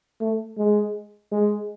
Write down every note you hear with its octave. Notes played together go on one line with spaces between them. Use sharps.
A3
G#3
G#3